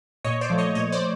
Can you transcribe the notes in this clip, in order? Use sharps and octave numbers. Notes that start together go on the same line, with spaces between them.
A#2 C#5 D#5
C5 D5
F3 A3
C#5 D#5
A#2 C#5 D#5
C5 D5